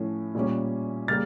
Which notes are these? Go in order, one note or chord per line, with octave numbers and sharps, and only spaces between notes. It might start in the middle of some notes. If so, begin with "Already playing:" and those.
Already playing: A2 F3 A3 C#4
A#2 G3 C#4
C#3 G3 A#3 F6 A6